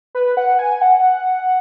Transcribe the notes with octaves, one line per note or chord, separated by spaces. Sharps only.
B4
F#5
G#5
F#5